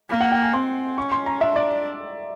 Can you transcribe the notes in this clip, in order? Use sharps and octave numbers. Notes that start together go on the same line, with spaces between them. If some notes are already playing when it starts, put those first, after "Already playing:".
A#3
F#5
G5
G#5
C4 C6
C#4 C#6
C6
A#5
D4 E5
D5